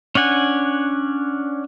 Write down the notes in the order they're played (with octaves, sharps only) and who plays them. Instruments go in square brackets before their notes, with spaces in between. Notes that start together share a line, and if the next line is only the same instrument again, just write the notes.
[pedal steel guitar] C#4 D4 F#5 G#5